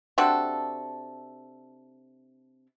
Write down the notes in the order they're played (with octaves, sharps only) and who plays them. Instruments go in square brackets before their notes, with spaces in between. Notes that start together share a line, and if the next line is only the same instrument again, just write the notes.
[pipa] C3 D4 F#4 A4